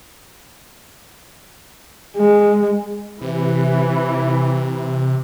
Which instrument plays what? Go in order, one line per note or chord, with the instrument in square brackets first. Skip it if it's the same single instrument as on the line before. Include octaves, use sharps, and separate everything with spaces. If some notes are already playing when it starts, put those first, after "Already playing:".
[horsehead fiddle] G#3
[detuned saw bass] C3 [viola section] E3